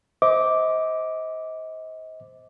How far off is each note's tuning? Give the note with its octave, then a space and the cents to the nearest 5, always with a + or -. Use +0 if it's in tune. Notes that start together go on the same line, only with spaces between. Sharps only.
C5 +0 D#5 +35 D6 -5